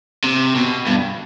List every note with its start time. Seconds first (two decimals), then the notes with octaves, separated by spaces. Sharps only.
0.24 C3
0.55 B2
0.87 G2